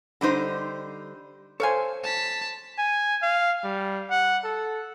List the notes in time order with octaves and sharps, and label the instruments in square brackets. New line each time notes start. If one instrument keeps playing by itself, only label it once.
[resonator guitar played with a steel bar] D3 G3 D#4 C5
[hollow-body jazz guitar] A4 C5 [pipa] C#5 F5 G#5
[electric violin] A5 B6
[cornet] G#5
F5
G3
F#5
A4